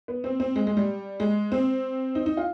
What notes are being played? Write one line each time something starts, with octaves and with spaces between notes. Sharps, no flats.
B3
C4
C4
G#3
G#3
G3
G#3
C4
D#4
D#4
F4